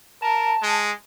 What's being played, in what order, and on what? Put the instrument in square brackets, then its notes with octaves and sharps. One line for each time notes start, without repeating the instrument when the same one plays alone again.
[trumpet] A#4 [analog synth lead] A5
[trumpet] G#3